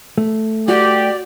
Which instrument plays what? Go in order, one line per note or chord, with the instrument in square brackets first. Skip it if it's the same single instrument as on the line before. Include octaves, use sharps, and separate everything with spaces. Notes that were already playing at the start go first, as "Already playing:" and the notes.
[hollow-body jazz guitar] A3
[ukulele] F#4 [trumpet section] G4 [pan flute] D5